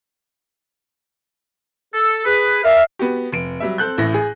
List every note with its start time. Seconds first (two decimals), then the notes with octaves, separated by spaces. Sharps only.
1.94 A4
2.25 G#4 B4
2.64 A#4 D5 E5 F5
2.99 B3 F#4 G4
3.32 F1 D7
3.60 F#3 G3 E5
3.78 C4 A4 F#6 G6
3.98 A1 A2 E5 A#6
4.14 G#4